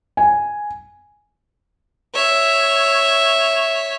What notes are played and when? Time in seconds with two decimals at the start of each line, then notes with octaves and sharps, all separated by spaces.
0.17 G#5
2.14 C#5 E5